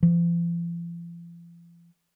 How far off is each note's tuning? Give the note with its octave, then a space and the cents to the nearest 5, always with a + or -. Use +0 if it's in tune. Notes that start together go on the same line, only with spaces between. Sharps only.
F3 -45